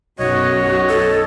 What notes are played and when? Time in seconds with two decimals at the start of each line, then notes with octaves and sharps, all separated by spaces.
0.19 B1 F#2 F#4 C#5 D#5
0.88 A4